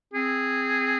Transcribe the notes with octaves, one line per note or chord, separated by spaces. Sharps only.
C4 G#4